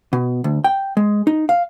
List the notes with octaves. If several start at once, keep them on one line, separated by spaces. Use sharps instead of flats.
B2
D2
G5
G#3
D#4
F5